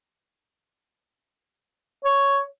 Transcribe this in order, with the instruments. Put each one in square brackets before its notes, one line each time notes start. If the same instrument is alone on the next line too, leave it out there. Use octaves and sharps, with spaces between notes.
[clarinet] C#5